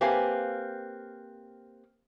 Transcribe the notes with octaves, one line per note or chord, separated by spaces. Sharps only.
A#3 C4 G4 B4 F5 G#5